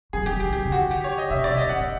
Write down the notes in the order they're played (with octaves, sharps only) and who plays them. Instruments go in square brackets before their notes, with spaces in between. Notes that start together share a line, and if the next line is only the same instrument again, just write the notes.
[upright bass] F#3 [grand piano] G#4
[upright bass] F3
[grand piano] G4
[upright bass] F#3
[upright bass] F3 [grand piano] G4
[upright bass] D#3 [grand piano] G4
[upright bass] D3
[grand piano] F#4
[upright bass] D3
[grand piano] G4
C#5
D#5
[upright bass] C3 [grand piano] E5
[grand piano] D5
[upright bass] C3
[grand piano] D#5
[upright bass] B2 [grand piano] F#5
[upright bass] A#2